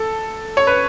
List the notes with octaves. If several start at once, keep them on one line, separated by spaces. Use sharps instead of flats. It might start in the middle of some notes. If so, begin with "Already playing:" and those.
Already playing: A4
C#5
B4